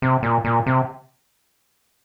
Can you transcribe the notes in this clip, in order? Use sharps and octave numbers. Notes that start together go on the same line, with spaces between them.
C3
A#2
A#2
C3